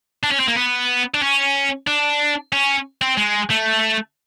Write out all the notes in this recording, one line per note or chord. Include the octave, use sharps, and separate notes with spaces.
D4
C#4
C4
A#3
B3
D4
C#4
D4
C#4
C4
G#3
A3